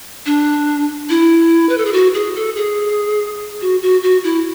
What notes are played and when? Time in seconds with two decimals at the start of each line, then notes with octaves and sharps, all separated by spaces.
0.26 D4
1.10 E4
1.69 B4
1.78 A4
1.85 G#4
1.93 F#4
2.14 G#4
2.36 A4
2.56 G#4
3.61 F#4
3.82 F#4
4.03 F#4
4.24 E4